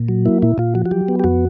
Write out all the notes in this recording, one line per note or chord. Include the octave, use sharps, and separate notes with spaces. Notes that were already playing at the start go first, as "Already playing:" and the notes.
Already playing: A#2
F#3
A#3 E4
A#2 E4
A#2 F4
F3 F#4
F#4
F#3 G4
B3
G4
F2 F#4